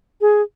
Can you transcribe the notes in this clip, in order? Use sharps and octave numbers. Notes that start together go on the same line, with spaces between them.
G#4